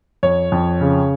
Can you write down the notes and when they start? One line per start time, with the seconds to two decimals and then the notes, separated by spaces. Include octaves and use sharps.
0.23 F2 C#5
0.52 F2
0.81 C#3